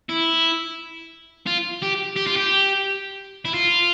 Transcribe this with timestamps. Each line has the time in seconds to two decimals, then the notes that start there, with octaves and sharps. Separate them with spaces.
0.09 E4
1.46 F4
1.82 G4
2.16 G4
2.26 F4
2.36 G4
3.45 E4
3.54 F4